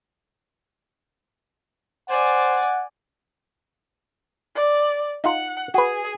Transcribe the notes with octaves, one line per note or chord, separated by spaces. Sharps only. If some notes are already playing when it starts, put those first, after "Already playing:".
C5 D5 F#5 G#5
D5
D#4 F4 F#5
F#4 G#4 B4